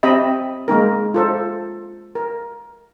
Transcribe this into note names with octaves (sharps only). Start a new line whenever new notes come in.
C4 G4 D#5 E5 B5
G#3 A#3 D#4 A#4
F4 A4 C5
A#4